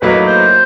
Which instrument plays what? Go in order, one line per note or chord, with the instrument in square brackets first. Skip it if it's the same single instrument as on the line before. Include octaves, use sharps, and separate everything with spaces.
[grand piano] A2 F#3 A#3 D#4 [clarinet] B4
[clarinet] C5